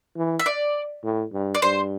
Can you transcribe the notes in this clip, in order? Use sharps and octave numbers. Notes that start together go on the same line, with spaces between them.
E3
E5
D5
A2
G2
D5
G2 C5